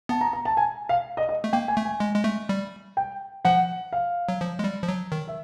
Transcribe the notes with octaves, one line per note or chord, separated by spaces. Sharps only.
B3 A5
A#5
A#5
A5
G#5
F5
D#5
D#5
A3
A#3 G5
G#5
A3
G#5
G#3
G#3
A3
G3
G5
F3 F#5
F5
F#3
F3
G#3
G3
F3
F#3
D#3
E5